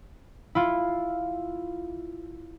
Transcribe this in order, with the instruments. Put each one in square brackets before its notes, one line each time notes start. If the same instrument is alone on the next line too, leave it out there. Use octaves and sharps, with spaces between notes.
[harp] E4 F4